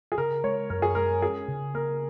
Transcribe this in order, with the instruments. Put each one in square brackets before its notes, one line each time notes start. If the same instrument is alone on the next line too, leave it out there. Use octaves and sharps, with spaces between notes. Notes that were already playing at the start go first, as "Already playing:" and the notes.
[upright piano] G#4
[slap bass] C#3 [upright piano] A#4
[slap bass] G#3 [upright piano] C#5
[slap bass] F#2 [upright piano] A#4
[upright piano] G#4
[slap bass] G#3 [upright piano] A#4
[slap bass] C#4 [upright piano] G#4
[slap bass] C#3
[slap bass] A#3 [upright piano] A#4